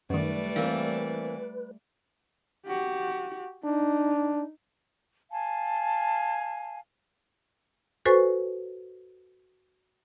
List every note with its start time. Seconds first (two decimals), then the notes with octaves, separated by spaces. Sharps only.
0.10 F#2 D#3 G3 A3 B4 D5
0.56 E3 A#3 C4
2.67 F#4 G4
3.64 D4 D#4
5.31 F5 G#5 A5
8.06 F#4 A4 B4 C5 G#5 C#6